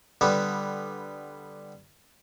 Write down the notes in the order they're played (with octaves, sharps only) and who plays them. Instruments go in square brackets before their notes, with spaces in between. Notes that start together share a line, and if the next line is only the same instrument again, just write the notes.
[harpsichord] D3 G3 B3